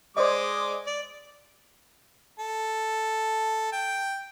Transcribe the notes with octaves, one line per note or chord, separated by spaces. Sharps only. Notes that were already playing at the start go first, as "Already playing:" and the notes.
G#3 C5 D5 D#5 D6 D#6
D5
A4
G5